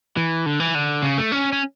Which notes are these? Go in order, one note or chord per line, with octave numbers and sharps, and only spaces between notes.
E3
D3
E3
D3
C#3
A3
C#4
C#4